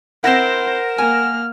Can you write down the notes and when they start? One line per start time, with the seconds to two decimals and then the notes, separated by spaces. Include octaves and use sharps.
0.24 C4 E4 A#4 C5 F#5 A#6 E7
0.98 A#3 G#5 F6